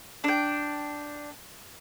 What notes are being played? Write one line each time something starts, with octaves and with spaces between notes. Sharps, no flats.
D4 G5